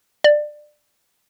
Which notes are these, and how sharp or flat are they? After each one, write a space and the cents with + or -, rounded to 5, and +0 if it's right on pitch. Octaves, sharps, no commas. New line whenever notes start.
D5 +20